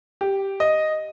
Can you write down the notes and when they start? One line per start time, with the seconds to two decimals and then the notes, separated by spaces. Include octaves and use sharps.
0.21 G4
0.60 D#5